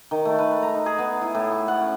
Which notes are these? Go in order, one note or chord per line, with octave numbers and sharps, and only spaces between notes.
D#3
A3
B4
A#5
D#4
G#4
B3
E4
A2
C#6
F#5
C#4